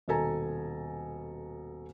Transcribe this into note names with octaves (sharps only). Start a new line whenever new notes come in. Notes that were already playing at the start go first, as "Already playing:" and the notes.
D#1 B2 A4 G#5 A#5